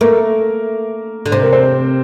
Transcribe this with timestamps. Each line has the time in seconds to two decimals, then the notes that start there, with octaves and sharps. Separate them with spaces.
0.01 A3 A#3 A#4
1.26 D3
1.32 C3 C5
1.42 A#4
1.52 C4 C5